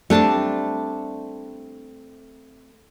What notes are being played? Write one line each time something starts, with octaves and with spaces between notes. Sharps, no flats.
G3 A3 C4 D4 A5